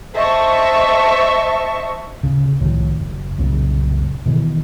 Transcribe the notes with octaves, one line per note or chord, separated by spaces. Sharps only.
C5 D#5 E5 A5 C#6
D1 C#3
C2 A2 D#3 F3
F#1
C2 F#2 A#2 C#3
B2 D#3 E3